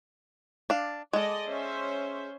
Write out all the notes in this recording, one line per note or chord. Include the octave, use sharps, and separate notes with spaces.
D4 F5
G#3 A4 D5 D#5
C#4 C5 E5